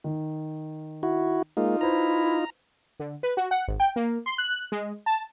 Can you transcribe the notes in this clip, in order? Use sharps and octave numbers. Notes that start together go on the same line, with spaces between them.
D#3
E4 F#4
G#3 A#3 D#4 F4
E4 B4 C5 A#5
D3
B4
F#4
F#5
G#1
G5
A#3
C6
F#6
G#3
A5